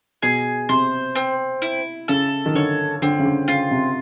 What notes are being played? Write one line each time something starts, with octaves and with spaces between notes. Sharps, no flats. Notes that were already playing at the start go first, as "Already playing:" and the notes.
B2 G#4
C3 C5
C4
E4
C#3 A4
D#3
D3 C#5
D3 C4
C#3
D3
C#3 F4
C3